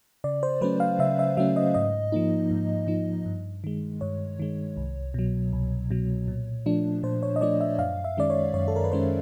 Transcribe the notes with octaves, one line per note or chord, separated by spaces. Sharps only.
C#3 D5
C5
F#3 A3 C#4 B4
F5
C#3 E5
E5
F#3 A3 C#4 E5
D#5
G#2 D#5
F3 A#3 D#4
G#2
F3 A#3 D#4
G2
D#3 G#3
G2 C#5
D#3 G#3
C2
B2 F#3
C2
B2 F#3
A#2
F3 A3 D4
A#2 C5
C#5
D#5
F3 A3 D4 D5
E5
F#2 F5
E5
D#3 G#3 C#4 D5
C#5
F#2 C#5
A4
A#4
B4
D#3 G#3 C#4 C5